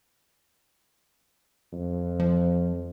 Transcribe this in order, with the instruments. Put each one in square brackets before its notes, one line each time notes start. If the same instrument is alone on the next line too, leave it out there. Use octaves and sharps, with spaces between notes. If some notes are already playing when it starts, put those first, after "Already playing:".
[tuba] F2
[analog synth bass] F3